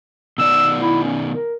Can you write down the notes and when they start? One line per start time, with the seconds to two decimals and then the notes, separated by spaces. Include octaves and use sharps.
0.38 B2 D#3 D5 E6
0.82 E4
1.03 C#4
1.32 A#4